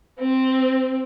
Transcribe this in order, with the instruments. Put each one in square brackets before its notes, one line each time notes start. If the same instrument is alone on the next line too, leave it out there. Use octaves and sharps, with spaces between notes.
[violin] C4